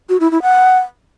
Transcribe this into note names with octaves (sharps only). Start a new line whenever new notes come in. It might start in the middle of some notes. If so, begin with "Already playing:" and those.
F#4
E4
E4
F#5